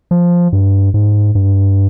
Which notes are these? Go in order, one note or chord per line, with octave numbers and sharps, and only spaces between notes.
F3
G2
G#2
G2